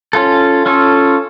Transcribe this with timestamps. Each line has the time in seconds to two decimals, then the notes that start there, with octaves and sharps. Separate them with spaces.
0.13 C#4 F4 A4
0.66 C#4 F4 A4